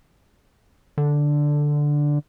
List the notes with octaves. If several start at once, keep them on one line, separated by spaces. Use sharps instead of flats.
D3